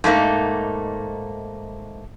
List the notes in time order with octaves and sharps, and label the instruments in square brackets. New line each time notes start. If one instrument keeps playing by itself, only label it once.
[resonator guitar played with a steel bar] G#2 A3 A#3 D#4